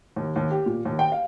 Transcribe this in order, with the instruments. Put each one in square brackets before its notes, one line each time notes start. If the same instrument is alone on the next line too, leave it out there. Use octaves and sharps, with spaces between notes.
[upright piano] D#2
D#2
G4
A#2
D#2
G5
F5